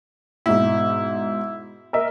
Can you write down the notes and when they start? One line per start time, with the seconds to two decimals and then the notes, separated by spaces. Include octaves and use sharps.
0.46 G#2 B2 E4
1.93 A#4 D#5 E5